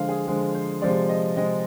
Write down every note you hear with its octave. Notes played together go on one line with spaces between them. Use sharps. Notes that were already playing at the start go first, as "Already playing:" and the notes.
Already playing: D3 F3 G#3 F5
G#4
D3 F3 G#3 G#4
C5
C3 F3 G#3 D5
D#5
C3 F3 G#3 D#5